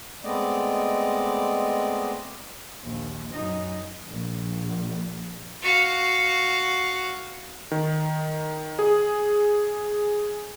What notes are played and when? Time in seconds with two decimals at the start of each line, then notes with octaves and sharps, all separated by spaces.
0.24 G#3 A3 B3 C4 D5 D#5
2.85 A#1 D#2
3.32 F#2 D#4
4.08 A#1
5.63 F#4 F5
7.71 D#3
8.79 G#4